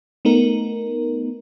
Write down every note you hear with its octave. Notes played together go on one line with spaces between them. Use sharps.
A3 B3 D#4 A#4